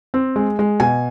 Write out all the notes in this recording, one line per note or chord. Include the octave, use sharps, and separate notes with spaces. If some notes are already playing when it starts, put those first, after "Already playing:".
C4
G#3
G#3
B2 G#5